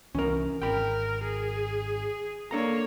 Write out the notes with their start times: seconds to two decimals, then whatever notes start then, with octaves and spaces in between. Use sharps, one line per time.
0.15 C2 E3 C#4 A#4
0.62 G#1 A#4 G5 B5
1.24 G#4
2.51 A#3 D4 A4 C#5 A#5